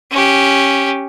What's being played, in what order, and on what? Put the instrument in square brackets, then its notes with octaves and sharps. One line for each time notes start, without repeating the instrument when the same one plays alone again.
[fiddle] C#4 G4